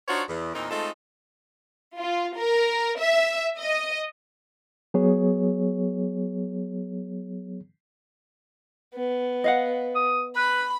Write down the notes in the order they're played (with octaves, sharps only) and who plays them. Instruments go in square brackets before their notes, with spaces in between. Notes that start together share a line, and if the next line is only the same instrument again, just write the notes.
[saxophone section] D4 D#4 F4 F#4 C5 C#5
E2
E2 A#2 C4 D#4 A#4
G#3 A3 C4 D#4 F4 A4
[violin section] F4
A#4
E5
D#5
[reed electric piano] F#3 B3 G#4 C#5
[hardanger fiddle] B3
[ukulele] D#5 F5 F#5
[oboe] D#6
[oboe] B4 [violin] B5